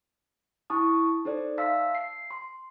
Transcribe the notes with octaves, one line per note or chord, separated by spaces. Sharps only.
E4 A5 C#6 D#6
D#4 A4 C5 D5
E5 F5 A5 C6 E6 B6
C7
C6